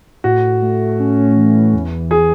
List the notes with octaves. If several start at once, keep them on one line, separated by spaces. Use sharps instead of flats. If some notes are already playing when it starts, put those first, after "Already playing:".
A2 F#4
A3
C#4
E3
E2
E3 G#4